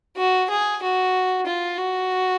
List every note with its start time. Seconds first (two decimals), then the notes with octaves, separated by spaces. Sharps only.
0.17 F#4
0.50 G#4
0.82 F#4
1.46 F4
1.78 F#4